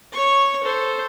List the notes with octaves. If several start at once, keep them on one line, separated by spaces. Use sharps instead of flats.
C#5 C#6
A4 C5